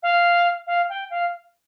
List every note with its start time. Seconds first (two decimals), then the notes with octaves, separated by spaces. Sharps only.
0.02 F5
0.66 F5
0.89 G5
1.10 F5